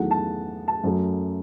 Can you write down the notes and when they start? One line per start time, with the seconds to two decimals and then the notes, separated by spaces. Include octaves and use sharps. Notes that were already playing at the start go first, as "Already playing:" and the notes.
Already playing: E2 D#3 F#3 A3 F#5
0.11 A5
0.68 A5
0.84 F#2 F#3 A3